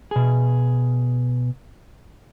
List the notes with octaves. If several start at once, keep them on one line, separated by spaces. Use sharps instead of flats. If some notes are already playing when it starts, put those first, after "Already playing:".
B2 G#4